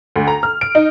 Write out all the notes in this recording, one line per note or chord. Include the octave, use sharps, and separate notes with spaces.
D2
A#5
F6
D7
D#4